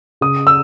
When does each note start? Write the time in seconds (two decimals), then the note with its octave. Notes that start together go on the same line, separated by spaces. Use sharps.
0.21 C#3 D#6
0.47 E6